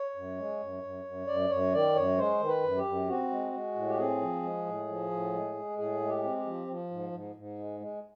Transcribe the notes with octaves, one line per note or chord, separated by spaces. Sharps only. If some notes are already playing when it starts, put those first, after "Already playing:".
Already playing: C#5
F#2
G#3
F#2
F#2
F#2
F#2 D5
F#2 C#5
D#3 D5
F#2 C#5
G#3 C5
D#3
B4
F#2
G4
F#2
C4 F#4
G#3
G#3
A2
G4
C4 G#4
F3
G#3
A2
F3
A2
G#3
G#3
A2 G#4
G#3
G4
C4
G4
F3
F3
G#2
G#2
G#2
G#3
G#3